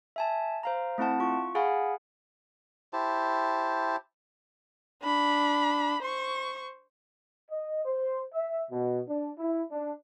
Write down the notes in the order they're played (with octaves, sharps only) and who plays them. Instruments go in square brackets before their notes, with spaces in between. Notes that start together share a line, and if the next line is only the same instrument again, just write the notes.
[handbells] E5 G#5 A5
C5 F5 A#5
A3 C4 E4 F#5 A5
F4 C#6
G#4 F5 F#5 G#5 B5
[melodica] E4 G4 C5 A5
[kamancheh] D4 B5
C5 C#6
[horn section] D#5
C5
E5
B2
D4
E4
D4